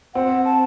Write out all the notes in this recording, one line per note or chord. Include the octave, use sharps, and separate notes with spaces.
C4 F#5
A5